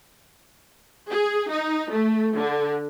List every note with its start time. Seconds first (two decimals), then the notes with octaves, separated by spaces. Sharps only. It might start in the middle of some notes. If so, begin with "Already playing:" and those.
1.10 G#4
1.51 D#4
1.91 A3
2.37 D3